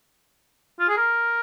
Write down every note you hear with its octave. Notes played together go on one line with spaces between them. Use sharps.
F4
G#4
A#4